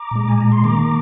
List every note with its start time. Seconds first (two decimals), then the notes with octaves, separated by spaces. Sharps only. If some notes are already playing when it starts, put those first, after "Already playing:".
Already playing: A#5 D6
0.11 A#2 G#3
0.29 G#5
0.41 A#5
0.52 C6
0.63 D#3 A#3 A#5 D6